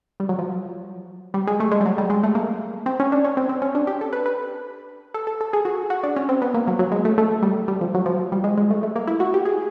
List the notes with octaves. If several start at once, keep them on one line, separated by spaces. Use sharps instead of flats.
G3
F#3
F3
G3
G#3
A3
G#3
G3
F#3
G3
G#3
A3
A#3
C4
C#4
D4
C#4
C4
C4
C#4
D4
G4
A4
B4
B4
A4
A4
A4
G#4
F#4
F#4
D4
C#4
C4
B3
A#3
F#3
F#3
G#3
A3
A3
G3
G3
F3
F#3
F3
G3
G#3
G#3
A3
A3
A#3
E4
F#4
G4
G#4